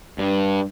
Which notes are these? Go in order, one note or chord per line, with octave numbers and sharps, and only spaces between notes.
G2